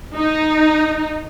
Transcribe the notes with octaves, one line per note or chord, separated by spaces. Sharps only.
D#4